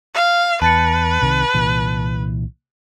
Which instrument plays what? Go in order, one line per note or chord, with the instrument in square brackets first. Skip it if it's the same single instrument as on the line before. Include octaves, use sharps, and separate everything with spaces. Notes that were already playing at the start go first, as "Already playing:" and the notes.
[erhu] F5
[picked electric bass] E2 [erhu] B4 [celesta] A5 A6 C#7
[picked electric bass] C2 C3 D#3
C2 A#2 E3